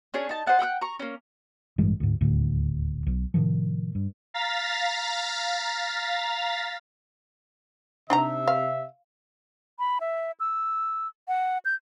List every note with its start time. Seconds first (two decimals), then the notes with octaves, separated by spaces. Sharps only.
0.14 C#4 D4 G#4 C#5
0.29 D#4 A5
0.46 C5 D#5 F#5 A5
0.59 F#5 G5 D#6 F#6
0.81 A#5 C#6
1.00 A#3 C#4
1.78 A1 G2 E3 G#3
2.00 D2 G#2
2.21 D#1 D2 A2
3.07 B1
3.34 A2 C3 D#3 F3
3.95 G2
4.34 F5 A#5 A6 B6
8.10 C3 D4 D#4 E5 A#5
8.48 F5
9.79 B5
10.00 E5
10.40 E6
11.28 F#5
11.65 G6